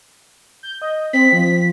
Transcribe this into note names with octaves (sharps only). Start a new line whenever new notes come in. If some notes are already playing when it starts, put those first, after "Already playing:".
G6
D#5
C4 B6
F3